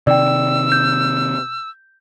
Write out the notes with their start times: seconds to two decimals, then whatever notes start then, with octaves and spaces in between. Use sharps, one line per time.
0.07 C3 D#3 D5 G5 E6
0.72 G6